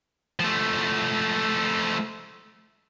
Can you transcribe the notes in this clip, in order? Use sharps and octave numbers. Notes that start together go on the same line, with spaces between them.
F3 A3